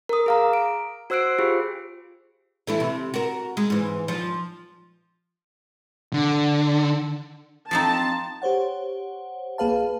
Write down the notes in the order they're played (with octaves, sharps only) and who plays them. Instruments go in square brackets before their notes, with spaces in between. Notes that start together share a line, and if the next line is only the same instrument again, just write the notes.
[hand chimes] A#4 D#6
G#4 F5 A#5
D7
F#4 C5 E6 F#6 C7 D7
F4 G4 G#4 C5
[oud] E3 A3 E4
C3
F#4 A#4
G#3
G#2 E3
F3
[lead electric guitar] D3
[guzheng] F3 C4 D#4 [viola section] A5
[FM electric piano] G4 C5 C#5 F#5
A#1 A#3 G#4 B4 F5 A5